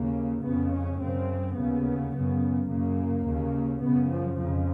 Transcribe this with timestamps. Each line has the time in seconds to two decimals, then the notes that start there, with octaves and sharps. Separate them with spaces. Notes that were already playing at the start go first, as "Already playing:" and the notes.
Already playing: D#2 C#3 A#3
0.43 F2 C#3 B3
0.72 C#4
1.00 F#2 C#3 C4
1.56 D#2 C#3 B3
2.12 F#2 C#3
2.68 F#2 C#3 A#3
3.25 D#2 C#3
3.80 F#2 C#3 B3
4.09 F3
4.37 F2 C#3 F3